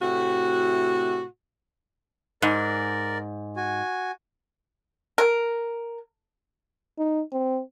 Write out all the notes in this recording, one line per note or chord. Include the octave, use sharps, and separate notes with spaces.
A2 C3 F#4
G#2 A#4 D5
F#4 G#5
A#4
D#4
C4